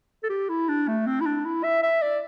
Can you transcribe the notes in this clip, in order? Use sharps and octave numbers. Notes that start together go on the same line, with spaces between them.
A4
G4
E4
D4
A3
C4
E4
D4
E4
E5
E5
D5